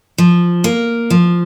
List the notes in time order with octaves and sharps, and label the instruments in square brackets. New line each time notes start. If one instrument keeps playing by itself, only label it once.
[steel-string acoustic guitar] F3
A#3
F3